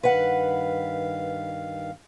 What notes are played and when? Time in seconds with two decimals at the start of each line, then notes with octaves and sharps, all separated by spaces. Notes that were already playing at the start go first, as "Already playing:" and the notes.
0.03 G2 D#3 B4 F5 F#5